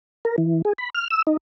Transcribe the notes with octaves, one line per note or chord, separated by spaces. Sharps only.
A#4
E3
G#4
B5
F6
E6
D#4